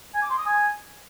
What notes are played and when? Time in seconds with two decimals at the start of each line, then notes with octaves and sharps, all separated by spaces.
0.15 G#5
0.22 D6
0.30 C6
0.38 D#6
0.46 G#5